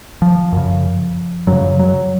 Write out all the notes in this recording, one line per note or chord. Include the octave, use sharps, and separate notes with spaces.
F3
F#2 C#3
F#2 C#3 F#3
F#3